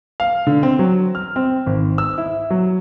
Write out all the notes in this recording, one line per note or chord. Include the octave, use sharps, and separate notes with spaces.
F5
D3
C4
F#3
F6
C4
G#1
E6
E4
F#3